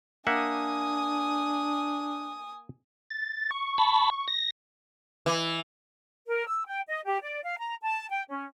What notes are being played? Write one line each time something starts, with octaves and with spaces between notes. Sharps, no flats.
A#3 D4 E5 F#5 G#5 D#6
A6
C#6
A5 B5
A#6
E3
A#4
E6
G5
D#5
G4
D5
F5
A#5
A5
G5
C#4